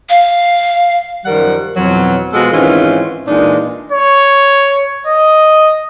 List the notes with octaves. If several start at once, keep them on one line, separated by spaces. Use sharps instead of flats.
F5
F#2 D#3 F3 G3 A#4 F#5
F2 B2 E3 F#3
B2 F3 G#3 B3 F#4 A4
G#2 D#3 E3 C4 C#4 F4
A#2 E3 G#3 D4 D#4
C#5
D#5